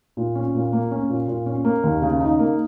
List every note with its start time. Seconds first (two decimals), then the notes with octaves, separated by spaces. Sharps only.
0.17 A#2
0.35 C#4
0.55 A#2
0.73 A#3
0.91 C#4
1.09 A#2
1.28 A#2
1.46 C#4
1.64 A#3
1.84 D#2
2.02 C#3
2.20 D#4
2.39 A#3